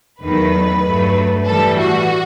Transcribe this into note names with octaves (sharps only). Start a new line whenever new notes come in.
E2 D#3 F#3 A3 B4
G2 F#3 A3
A2 E3 G3 A4
F#4